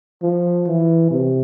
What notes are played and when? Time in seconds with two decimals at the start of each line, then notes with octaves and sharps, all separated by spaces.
0.23 F3
0.67 E3
1.11 C3